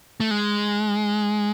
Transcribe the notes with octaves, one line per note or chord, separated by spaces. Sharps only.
A3
G#3